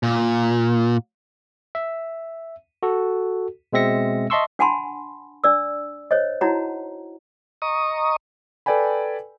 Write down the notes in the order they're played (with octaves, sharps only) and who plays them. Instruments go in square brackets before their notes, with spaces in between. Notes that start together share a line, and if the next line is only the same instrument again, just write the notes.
[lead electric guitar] A#2
[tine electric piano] E5
F#4 A4
B2 G#3 C4 E5 A#6 C#7
D#5 E5 A5 C6 C#6 E6
[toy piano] D4 F#5 G#5 A5 B5 C6
D4 D5 E6
C5 C#5 D#5
D#4 E4 F#4 C#5 F#5 A#5
[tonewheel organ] D#5 A#5 C#6 D#6
[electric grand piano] A4 B4 D5 G5 G#5 B5